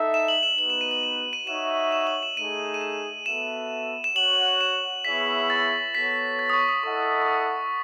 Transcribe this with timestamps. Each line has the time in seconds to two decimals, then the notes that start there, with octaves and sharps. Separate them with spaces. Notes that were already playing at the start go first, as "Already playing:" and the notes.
Already playing: D#4 A4 E5
0.14 E7
0.28 F#7
0.43 E7
0.58 B3 D#4 F#4 B4 F#7
0.70 E7
0.81 D#7
0.91 F#7
1.03 E7
1.33 D#7
1.47 D#4 F#4 C#5 E5 E7
1.92 E7
2.07 F#7
2.23 E7
2.37 A3 D#4 G#4 D#7
2.74 D#7
2.81 E7
3.26 B3 F#4 A4 E5 E7
4.04 E7
4.16 F#4 C#5 F#5 F#7
4.61 E7
5.05 B3 E4 G#4 C#5 E5 B6
5.50 A6
5.94 B3 F#4 A4 C#5 B6
6.39 A6
6.50 D#6
6.53 C#6
6.69 D#6
6.84 E4 A4 D#5 F#5 C#6
7.22 C#6
7.28 D#6